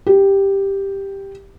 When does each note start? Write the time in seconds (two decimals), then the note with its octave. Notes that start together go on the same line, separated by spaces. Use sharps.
0.06 G4